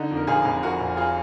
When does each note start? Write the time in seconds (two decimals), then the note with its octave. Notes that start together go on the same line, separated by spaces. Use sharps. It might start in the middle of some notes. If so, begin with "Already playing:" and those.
Already playing: D3 D#4
0.11 F2
0.17 A#4
0.27 F1 F4 G#4
0.45 F1
0.62 F2 F#4 A#4
0.80 F1
0.97 F4 G#4